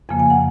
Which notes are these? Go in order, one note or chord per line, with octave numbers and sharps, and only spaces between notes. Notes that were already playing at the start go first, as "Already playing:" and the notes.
F2 C#3 F3 A#3 G#5
G#5
F#5